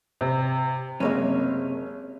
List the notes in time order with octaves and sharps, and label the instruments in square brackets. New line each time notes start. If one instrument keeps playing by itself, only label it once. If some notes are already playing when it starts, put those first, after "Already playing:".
[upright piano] C3
[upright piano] F#1 G#3 [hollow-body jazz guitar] C3 A#3 C#4